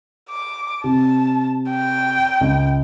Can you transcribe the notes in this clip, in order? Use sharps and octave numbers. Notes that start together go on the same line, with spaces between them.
D6
C3 A5
G5
C#2